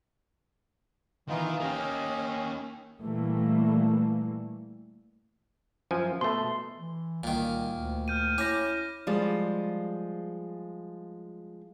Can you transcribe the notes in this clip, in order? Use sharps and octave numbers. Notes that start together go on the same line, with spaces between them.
D#3 E3 B3 D#4 F4 A#4
A#3 C#4 G4 D#5
A#2 E3 G3 A3 A#3
F#2 F3 G#5
B2 A3 C6
E3
C2 A#2 D#3
D2
F6 G6 D#7
C#4 E4 D6 G6 A#6
F3 G3 G#3